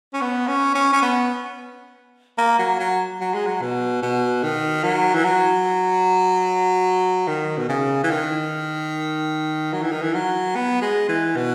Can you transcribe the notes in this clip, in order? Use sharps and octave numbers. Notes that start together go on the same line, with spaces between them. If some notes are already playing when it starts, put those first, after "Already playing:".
C#4
B3
C#4
C#4
C#4
B3
A#3
F#3
F#3
F#3
G#3
F#3
B2
B2
D#3
F#3
E3
F#3
D#3
B2
C#3
E3
D#3
F#3
E3
D#3
E3
F#3
B3
G#3
E3
B2